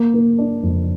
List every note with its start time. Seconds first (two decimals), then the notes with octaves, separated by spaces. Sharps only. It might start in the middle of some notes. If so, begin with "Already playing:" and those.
Already playing: A#3
0.14 A#3
0.38 D4
0.63 F2